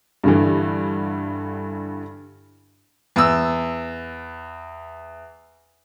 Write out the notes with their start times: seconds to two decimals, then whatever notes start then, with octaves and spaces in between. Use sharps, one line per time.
0.24 G2 D3 E3
3.16 E2 E6